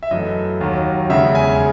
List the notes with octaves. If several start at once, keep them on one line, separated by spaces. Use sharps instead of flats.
E5
F#2 E3 A3 D#5
D#2 D#3 F#3
E2 C#3 G#3 E5
G#5